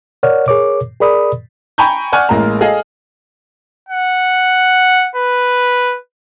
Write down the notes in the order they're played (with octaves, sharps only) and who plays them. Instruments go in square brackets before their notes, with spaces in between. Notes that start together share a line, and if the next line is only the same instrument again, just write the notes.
[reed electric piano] A#4 C#5 D5 F#5 F6
G#4 A#4 C#5 D6
G#4 A#4 D5 B5 D#6
[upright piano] G5 G#5 A#5 B5 C#6 G6
D5 F#5 G#5 C#6 F6
A1 G#3 A#3 A#5
G#4 A4 D#5 F5
[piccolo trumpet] F#5
B4